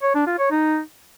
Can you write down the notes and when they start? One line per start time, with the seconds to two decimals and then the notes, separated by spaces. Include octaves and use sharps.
0.03 C#5
0.15 D4
0.27 F4
0.39 C#5
0.51 D#4